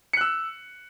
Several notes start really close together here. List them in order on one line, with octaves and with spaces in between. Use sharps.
C#7 F#6 E6